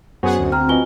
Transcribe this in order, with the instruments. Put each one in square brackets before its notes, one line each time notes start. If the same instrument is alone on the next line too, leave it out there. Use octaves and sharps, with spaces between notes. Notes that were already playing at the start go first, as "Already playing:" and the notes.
[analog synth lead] F#2 [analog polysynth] B3 G#4 F#5 [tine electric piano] F#4 C5 G#5
[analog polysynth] D2
[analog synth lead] C4 [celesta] A#5 F6
[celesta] F4 G#5 G7 [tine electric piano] F#4 B4 D#5